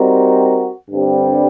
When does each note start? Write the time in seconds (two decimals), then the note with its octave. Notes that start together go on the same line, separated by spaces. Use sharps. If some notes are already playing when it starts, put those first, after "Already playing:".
Already playing: G3 C4 D#4 F#4 A#4
0.91 G2 D3 G3 C4